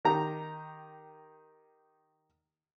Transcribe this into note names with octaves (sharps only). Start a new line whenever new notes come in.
D#3 G4 A#5